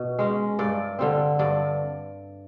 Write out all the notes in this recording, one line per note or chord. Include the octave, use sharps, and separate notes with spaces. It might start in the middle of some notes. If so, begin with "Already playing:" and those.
Already playing: B2
G#3 C#4
G2 D5
D3 G3 C4
G2 D5